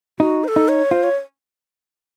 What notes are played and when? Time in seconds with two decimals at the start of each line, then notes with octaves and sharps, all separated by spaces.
0.20 D#4 F#4
0.44 C5
0.48 A4
0.56 D#4
0.68 C#5
0.91 F4 C5
1.03 C#5